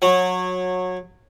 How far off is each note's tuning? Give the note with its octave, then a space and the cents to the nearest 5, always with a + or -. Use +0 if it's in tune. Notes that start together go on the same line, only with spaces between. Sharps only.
F#3 -20